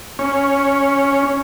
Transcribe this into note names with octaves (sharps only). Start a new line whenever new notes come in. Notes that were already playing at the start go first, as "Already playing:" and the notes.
C#4